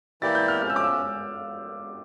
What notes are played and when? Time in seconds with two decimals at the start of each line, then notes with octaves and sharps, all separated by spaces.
0.22 E3 A#3 E4 G4 D5 A6
0.35 G6
0.48 F6
0.62 F3 A3 C#4 F6
0.70 E6
0.76 D6
0.84 E6